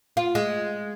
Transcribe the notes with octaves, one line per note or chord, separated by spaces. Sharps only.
F4
G#3